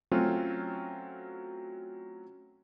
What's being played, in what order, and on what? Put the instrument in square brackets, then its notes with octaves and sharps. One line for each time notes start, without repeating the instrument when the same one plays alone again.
[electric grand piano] F#3 A3 C4 C#4 F4 F#4